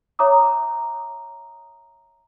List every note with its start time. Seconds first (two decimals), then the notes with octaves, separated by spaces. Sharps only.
0.19 C#5 E5 A#5 D6 D#6